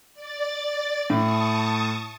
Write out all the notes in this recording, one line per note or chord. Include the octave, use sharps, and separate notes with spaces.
D5 A6
A2 A5 C#6 D#6